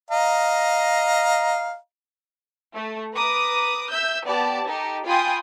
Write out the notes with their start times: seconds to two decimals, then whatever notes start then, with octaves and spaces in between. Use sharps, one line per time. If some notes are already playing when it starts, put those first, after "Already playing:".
0.11 D#5 F5 A#5
2.74 A3
3.14 B4 A#5 D6 D#6
3.90 E5 E6 G6
4.26 B3 G4 D5 A5
4.66 D#4 G4 A4
5.06 F4 G5 G#5 B5 C6 D#6